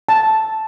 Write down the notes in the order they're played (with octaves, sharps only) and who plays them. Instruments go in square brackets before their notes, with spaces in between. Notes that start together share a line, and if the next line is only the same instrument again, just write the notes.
[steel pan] A5